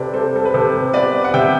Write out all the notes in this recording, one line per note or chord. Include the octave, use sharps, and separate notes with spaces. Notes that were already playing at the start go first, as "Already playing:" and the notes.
Already playing: C3 A4 B4 C5 D5
G3 A4 C5
A4
B4
C3 A4 C5
B3 B4 D5
F#5
C3 E5 G5